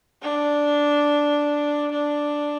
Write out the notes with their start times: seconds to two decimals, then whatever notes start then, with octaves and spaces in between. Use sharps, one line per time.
0.22 D4
1.91 D4